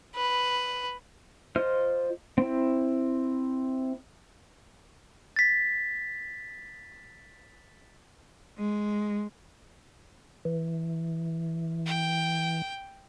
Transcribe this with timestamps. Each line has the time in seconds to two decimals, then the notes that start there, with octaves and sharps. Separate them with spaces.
0.16 B4
1.56 F4 C5 D#5 F6
2.38 C4 E4
5.36 A6 B6
8.58 G#3
10.45 E3
11.86 G5